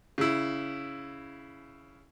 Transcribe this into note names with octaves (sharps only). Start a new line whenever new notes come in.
C#3 E4